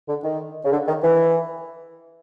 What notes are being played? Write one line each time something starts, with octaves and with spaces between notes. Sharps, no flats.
D3
D#3
C#3
D3
D#3
E3